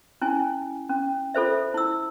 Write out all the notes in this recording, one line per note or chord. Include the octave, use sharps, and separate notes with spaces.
C#4 E4 G#5
C#4
F4 A4 C5 E5
E4 E6